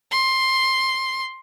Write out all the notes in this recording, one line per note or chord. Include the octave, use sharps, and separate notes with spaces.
C6